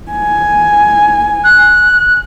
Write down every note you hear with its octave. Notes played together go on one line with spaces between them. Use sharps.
G#5
F#6